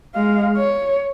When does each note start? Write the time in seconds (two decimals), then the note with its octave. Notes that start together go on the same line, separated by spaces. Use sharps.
0.15 G#3 F5
0.57 C#5